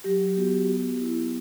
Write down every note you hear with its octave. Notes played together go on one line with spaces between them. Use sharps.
F#3 G4
B3 F#4
B3
E4